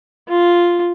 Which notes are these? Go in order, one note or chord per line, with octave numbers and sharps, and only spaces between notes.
F4